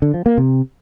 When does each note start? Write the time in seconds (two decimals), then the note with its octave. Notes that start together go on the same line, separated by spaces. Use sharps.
0.02 D3
0.14 F3
0.26 A#3
0.38 C3